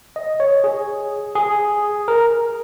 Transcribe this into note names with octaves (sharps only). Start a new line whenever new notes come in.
D#5
C#5
G#4
G#4
A#4